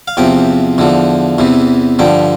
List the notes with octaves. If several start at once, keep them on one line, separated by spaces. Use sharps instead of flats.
F5
E2 C3 F3 G5
E2 D3 F3
E2 C3 E3
G2 D3 F3 G5